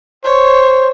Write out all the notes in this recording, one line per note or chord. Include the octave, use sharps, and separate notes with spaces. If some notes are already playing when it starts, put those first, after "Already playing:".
C5 C#5